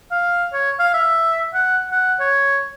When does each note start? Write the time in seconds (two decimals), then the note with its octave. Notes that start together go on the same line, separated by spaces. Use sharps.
0.12 F5
0.53 C#5
0.79 F5
0.94 E5
1.54 F#5
1.91 F#5
2.20 C#5